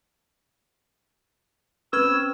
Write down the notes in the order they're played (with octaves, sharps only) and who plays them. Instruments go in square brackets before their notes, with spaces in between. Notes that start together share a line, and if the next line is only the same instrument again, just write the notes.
[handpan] C4 B4 [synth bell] C#4 F6 G#6 [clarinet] E6